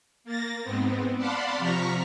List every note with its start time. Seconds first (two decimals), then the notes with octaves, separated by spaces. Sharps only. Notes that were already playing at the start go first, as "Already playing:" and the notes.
0.24 A#3 A6 A#6
0.63 G#2 B3 C4
1.17 D5 F5 F#5 A5 B5 C6
1.58 C3 F3 A#5 C#6 F6 B6